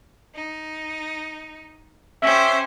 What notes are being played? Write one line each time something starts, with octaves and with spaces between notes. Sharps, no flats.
D#4
C#4 G4 C5 E5